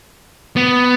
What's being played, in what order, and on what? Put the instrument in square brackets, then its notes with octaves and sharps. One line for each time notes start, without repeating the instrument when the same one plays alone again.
[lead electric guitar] B3